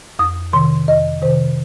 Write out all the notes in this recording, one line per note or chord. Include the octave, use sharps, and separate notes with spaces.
F2 D#6
C3 D#3 C6
F2 D#5
C3 D#3 C5